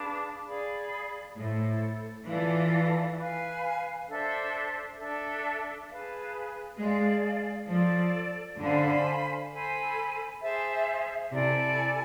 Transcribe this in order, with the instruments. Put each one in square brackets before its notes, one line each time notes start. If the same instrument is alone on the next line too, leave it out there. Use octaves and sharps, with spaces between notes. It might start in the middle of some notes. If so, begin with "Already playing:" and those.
Already playing: [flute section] D4 G#4 B4 F5
G#4 D5 F5 B5
[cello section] A2 [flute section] E4 A4 C5
[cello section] E3 [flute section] F4 A4 D5 F5
[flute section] B4 F5 G#5
D4 A4 C5 E5
D4 A4 E5
G#4 B4 F5 A5
[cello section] G#3 [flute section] G#4 D5 F5 A5
[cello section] F3 [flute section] A4 D5 A5
[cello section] D3 [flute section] C5 F5 G#5 B5
[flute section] A4 C5 G#5 B5
G#4 C5 E5 A5
[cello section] C3 [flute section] E4 A4 D5 G#5